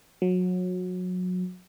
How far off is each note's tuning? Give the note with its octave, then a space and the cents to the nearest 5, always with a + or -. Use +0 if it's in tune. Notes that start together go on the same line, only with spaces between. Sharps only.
F#3 -25